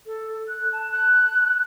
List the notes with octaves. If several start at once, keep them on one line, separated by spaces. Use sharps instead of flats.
A4
F#6
A5
F#6